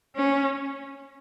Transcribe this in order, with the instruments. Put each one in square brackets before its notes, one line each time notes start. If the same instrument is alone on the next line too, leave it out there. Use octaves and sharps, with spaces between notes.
[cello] C#4